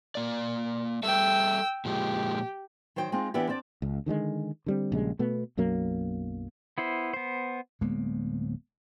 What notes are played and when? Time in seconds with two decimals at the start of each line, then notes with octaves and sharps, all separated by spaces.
0.15 A#3 D5
1.03 G3 A4 E5 G5 E6
1.85 A#2 F3 G#3 G4
2.96 D#3 F#3 C5 G5
3.12 G#3 C4 D#4 F4
3.34 E3 B3 D4 E4 G4
3.49 C4 D4 D5
3.82 C#2
4.06 D3 D#3 G3 G#3
4.66 D3 G3 C4
4.92 A#1 C#3 G3 G#3
5.19 B2 A3 B3
5.57 B1 F#2 F#3 A#3
6.78 B3 E4 C5
7.13 B3 C5
7.81 D1 G#3 A#3 B3